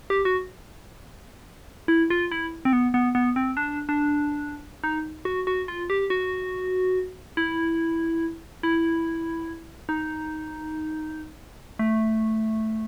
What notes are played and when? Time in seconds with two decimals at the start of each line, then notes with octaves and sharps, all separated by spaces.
0.10 G4
0.25 F#4
1.88 E4
2.10 F4
2.31 E4
2.65 C4
2.73 B3
2.94 B3
3.15 B3
3.36 C4
3.57 D4
3.89 D4
4.84 D#4
5.25 F#4
5.47 F#4
5.68 F4
5.90 G4
6.10 F#4
7.37 E4
8.63 E4
9.89 D#4
11.79 A3